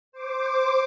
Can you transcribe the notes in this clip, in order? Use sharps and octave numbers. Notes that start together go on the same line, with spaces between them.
C5 D6